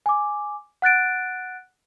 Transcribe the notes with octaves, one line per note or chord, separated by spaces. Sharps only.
G#5 D6
F#5 F#6 A6 D7